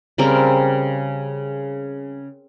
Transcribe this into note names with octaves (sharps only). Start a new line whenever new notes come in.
C#3 G3 C4 A#4